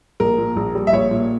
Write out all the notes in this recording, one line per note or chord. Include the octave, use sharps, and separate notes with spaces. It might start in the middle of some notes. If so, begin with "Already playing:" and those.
A#1 A#4
A#2
A#1
G3
E5
A#1 C#5
A#2